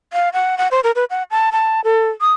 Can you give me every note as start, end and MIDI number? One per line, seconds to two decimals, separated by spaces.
0.13 0.29 77
0.33 0.58 78
0.58 0.68 78
0.71 0.80 72
0.84 0.91 70
0.96 1.04 71
1.10 1.23 78
1.31 1.50 81
1.52 1.81 81
1.84 2.09 69
2.21 2.32 87